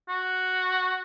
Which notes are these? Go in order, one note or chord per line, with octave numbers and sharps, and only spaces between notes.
F#4